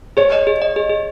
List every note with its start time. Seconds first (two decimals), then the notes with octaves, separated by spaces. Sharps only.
0.17 G#4 C#5
0.32 D#5
0.47 G#4
0.62 D#5
0.76 G#4
0.90 G#4